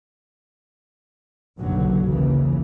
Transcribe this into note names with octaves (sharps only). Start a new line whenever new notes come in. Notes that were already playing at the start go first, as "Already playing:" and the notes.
F#1 B1 G2 D3 F#3
D#2 C#3 E3